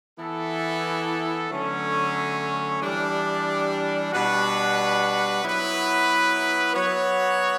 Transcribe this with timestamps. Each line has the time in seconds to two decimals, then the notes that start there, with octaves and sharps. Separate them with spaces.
0.17 E3 B3 E4 A4
1.49 D3 F#3 A3 C#4
2.80 E3 G3 D4 G4
4.12 B2 G3 D4 F#4 B4
5.43 F#3 B3 E4 B4
6.73 F#3 B3 F#4 C#5